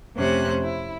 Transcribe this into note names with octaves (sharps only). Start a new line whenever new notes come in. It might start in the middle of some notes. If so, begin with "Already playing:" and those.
F2 C3 A3 C#4 C5 F#6
E4